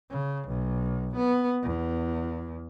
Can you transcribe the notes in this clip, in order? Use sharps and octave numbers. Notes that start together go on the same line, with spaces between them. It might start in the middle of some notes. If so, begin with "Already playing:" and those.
C#3
B1
B3
E2